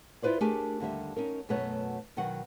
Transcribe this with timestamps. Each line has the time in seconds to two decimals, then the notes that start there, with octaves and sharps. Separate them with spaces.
0.22 E4 F4 B4 C5 D5
0.41 A3 D4 G4 G#4 A#4 G#5
0.80 D#2 D3 G3 E5
1.16 C#4 D#4 A#4
1.49 F#2 B2 A3 B3 D#4 C#5
2.17 B2 D#3 F#3 F#5